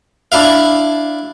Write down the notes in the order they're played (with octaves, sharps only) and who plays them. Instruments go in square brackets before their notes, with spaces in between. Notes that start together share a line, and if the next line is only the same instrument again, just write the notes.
[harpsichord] D4 E4 E5 F5